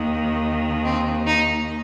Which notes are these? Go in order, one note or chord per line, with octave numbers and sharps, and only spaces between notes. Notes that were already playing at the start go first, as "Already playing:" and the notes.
Already playing: D#2 D#3
C4
D#4